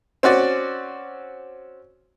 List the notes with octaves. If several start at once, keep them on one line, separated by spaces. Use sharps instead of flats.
C4 C#4 F#4 D5